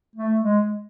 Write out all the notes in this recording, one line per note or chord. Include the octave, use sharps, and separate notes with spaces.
A3
G#3